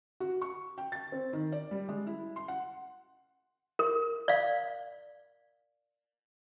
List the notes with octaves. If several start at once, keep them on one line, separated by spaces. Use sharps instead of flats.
F#4
C#6
G5
A6
C4
D#3
D5
G3
G#3
E4
C6
F#5
A#4
D5 F5